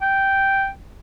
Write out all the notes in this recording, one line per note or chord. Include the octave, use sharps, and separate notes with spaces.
G5